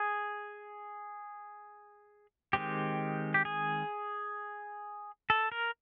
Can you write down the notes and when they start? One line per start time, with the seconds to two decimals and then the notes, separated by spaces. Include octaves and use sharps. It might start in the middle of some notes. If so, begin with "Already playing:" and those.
Already playing: G#4
2.53 D#3 G#3 C4 G4
3.34 G4
3.45 G#4
5.30 A4
5.52 A#4